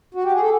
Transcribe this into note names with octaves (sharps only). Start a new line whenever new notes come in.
F#4
G4
G#4
A4